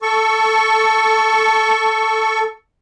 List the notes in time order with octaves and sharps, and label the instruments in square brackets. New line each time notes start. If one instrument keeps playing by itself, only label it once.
[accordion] A4 C#6